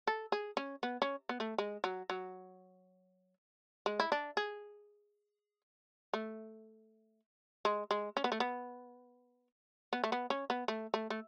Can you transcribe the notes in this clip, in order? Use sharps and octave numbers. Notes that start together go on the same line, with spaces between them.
A4
G#4
C#4
B3
C#4
B3
A3
G#3
F#3
F#3
G#3
E4
D4
G#4
A3
G#3
G#3
C#4
B3
A3
B3
B3
A3
B3
C#4
B3
A3
A3
A3